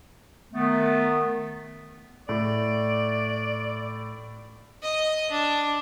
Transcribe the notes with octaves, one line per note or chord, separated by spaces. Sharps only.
D#3 A3 B3
A2 D5
D#5
D4